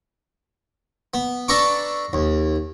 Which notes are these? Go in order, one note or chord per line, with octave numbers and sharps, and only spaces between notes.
B3
D4 A4 B4 A#5 C#6 D6
D#2